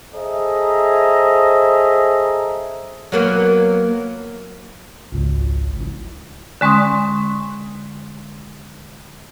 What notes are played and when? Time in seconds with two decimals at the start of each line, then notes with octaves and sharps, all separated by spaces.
0.15 G#4 A4 C5 D#5 E5 A#5
3.12 F#3 A#3 B3
5.12 G#1 C#2
5.80 E4
6.61 D3 G#3 C#4 C6 D#6